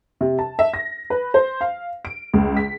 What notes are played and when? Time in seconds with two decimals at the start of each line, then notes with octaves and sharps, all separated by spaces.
0.21 C3
0.39 A5
0.59 E5
0.74 A#6
1.10 B4
1.34 C5
1.61 F5
2.05 D7
2.34 C#2
2.57 B6